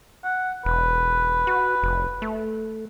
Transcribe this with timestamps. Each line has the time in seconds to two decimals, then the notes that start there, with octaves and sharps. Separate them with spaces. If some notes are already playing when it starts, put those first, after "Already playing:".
0.24 F#5
0.65 E1 B4
1.47 F#4
1.83 F1
2.22 A3